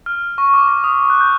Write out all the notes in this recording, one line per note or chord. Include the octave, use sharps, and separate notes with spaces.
F6
C#6
D6
D6
D#6
D#6
F#6
G6